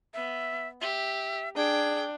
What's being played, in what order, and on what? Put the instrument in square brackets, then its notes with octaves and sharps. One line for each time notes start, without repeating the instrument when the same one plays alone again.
[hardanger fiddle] B3 [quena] E5
[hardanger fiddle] G4 [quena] E5
[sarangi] D4 [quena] G#4 [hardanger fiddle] G5